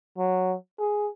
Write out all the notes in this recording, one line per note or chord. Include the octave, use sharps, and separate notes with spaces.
F#3
G#4